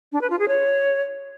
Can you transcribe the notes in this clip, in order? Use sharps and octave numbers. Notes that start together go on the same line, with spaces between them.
D4
B4
F4
G#4
C#5